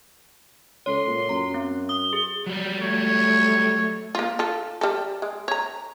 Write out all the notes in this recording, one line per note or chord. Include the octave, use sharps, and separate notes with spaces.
C#2 A4 C#5 C6
A#2
F#2 A#5
C4
D#6 G7
G#4
F#3 G3
A3 C#5
A#3 F4
F4 A4
G3 A4
G#3
C#5 A#5